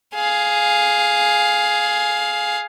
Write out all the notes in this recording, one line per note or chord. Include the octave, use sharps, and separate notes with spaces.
G#4 F5